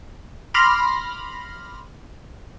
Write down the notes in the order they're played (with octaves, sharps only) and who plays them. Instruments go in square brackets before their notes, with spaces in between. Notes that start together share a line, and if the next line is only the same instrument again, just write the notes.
[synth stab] B5 C6 D6 F6 A#6